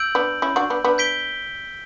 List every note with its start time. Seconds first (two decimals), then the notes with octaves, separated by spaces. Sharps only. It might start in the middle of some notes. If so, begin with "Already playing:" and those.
Already playing: E6 G6 D7 F#7
0.15 B3 D4
0.42 C#4 E4
0.56 D4 F#4
0.70 B3 D4
0.84 B3 D4
0.98 G6 B6 D7 G7